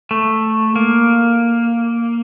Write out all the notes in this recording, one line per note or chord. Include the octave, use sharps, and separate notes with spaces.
A3
A#3